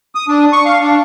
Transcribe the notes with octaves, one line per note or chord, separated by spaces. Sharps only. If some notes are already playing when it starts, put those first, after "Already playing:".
D#6
D4
C#6
F5
D4